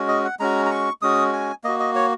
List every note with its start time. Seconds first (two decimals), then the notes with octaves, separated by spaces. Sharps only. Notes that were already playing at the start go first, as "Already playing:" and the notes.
Already playing: G#3 C#4 F#4
0.08 D#5
0.24 F#5
0.39 G#3 C#4 F#4 A#5
0.66 A#5
0.71 C#6
1.02 G#3 C#4 F#4 D#6
1.33 G#5
1.64 A#3 F#4 D#5
1.80 D#5
1.95 C#5